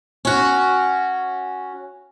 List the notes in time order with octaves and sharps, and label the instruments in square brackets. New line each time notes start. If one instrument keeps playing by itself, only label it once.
[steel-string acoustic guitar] C#4 F#4